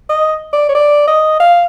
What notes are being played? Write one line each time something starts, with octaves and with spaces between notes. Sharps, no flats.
D#5
D5
C#5
D5
D#5
F5